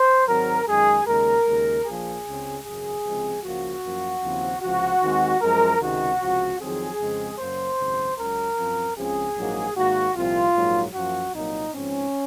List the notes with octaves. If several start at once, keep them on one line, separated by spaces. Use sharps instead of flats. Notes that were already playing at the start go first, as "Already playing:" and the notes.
Already playing: C5
G#1 G#2 F#3 C4 A#4
F#2 D#3 G#3 G#4
D#2 C#3 G#3 A#4
D#2 C#3 G#3
A#1 A#2 F3 G#4
C#2 C#3 G#3 C4
G#1 F#2 C#3 G#4
C#2 C3 F3 G#3 C4
C#2 C#3 F3 A#3 F#4
F#2 F3 A#3
D#2 C#3 F3 C4
C#2 C3 F3 F#4
D#2 D#3 G#3 C4
F#2 F3 G#3 A#4
C#2 C3 D#3 G#3 F#4
C#2 C3 F3
F2 D#3 F#3 C4 G#4
F2 C#3 G#3 C4
F#2 C#3 F#3 A#3 C5
G#1 F#2 C#3 F#3
C#2 C#3 F#3 A#4
F#2 F3 C4
C#2 C#3 F3 C4 G#4
A#1 G#2 F#3 A#3
G#2 D#3 A#3 F#4
C2 A#2 F3 C4 F4
A#1 G#2 F#3 A#3
F#2 F3 A#3 F#4
C2 A#2 F#3 A#3 D#4
G#2 F3 C4 C#4